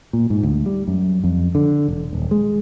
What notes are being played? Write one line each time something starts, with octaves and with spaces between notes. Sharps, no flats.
A#2
G#2
D2
G3
F#2
F2
D3
E1
D#1
G#3